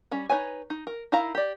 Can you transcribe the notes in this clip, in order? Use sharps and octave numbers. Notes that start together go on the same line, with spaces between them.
G3 C#4
D#4 E4 B4 C#5 G#5
D#4
A#4
D#4 E4 A#4 F5 A#5
G4 D5